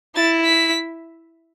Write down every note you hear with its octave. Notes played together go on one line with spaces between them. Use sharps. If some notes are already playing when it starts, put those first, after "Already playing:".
E4 A6
B6